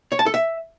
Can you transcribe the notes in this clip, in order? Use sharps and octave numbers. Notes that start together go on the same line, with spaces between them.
C#5
A5
A4
E5